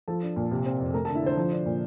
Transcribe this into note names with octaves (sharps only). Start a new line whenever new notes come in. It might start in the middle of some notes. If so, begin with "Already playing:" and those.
F3 A4 A5
D4
A#2
C3
C4
F2
A3 A#4 A#5
D3 A4 A5
E4 E5
D3 C5
F3
D4
A#2